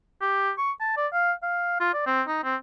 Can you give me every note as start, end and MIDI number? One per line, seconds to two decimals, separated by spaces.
0.21 0.51 67
0.58 0.71 85
0.80 0.96 81
0.97 1.07 74
1.13 1.32 77
1.43 1.79 77
1.80 1.91 65
1.93 2.03 74
2.06 2.22 60
2.28 2.43 63
2.43 2.56 60